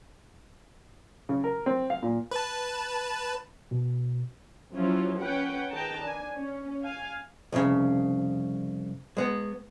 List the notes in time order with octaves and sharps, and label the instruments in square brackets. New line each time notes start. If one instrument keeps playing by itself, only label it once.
[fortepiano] C#3
A#4
C4
F5
A#2
[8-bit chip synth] B4 A5
[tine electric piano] B2
[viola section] F3 F#3 C#4 E4 F4
C#4 B4 F#5 G5
D#3 G#4 B4 G5 A5 A#5
D4 G#5
C#4
F5 G#5
[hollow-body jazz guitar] C2 F2 A2 C#3
G#3 B3